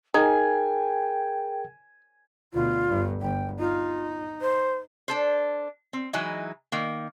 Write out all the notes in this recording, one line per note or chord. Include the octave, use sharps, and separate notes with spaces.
D#4 G#4 A#4 G5 G#5
D2 B2 F4
G1 G2
G1 G5
D#4 F4
C5
D4 A4 C5
C4
E3 F#3 G#3 D#4 E4
D#3 A#3